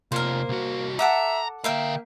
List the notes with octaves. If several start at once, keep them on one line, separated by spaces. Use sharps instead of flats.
C3 A#3 F4 A#4 C5
C2 F#4
A4 E5 F#5 A#5 D6
D3 A#3 A#4 E5 F5 G5